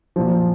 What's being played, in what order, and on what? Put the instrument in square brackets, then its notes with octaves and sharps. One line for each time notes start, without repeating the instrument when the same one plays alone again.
[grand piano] A#2 F3